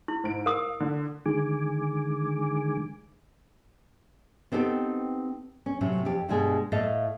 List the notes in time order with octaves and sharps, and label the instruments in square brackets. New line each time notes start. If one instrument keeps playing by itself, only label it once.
[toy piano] E4
[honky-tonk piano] G#2 D7
[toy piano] A#4 D#6 [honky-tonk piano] F5
[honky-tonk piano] D3
[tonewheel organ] D3 D#3 G#3 G#5 D6
[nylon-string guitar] B3 C4 D#4 G4 A4
C#4
A2 C3 F#3 C#4
F2 G4
G2 B2 G3 G#3 G#4 A4
A2 A3 A4 D#5 F5